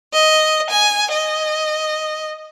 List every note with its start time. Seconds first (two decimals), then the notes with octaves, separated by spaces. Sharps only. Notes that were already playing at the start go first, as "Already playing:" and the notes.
0.14 D#5
0.70 G#5
1.12 D#5